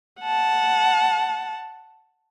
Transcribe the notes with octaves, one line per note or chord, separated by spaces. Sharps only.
F#5 A5